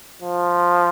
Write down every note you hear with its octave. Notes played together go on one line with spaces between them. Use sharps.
F3